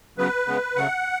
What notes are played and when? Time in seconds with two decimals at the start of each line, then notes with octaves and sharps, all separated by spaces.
0.18 C#3 F#3 B3 B4
0.47 C#3 G#3 B3
0.76 C#3 F#3 A3 F#5